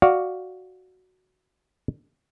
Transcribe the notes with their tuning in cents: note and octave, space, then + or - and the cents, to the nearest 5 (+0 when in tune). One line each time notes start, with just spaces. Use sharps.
F#4 +0 D5 +0 F5 +5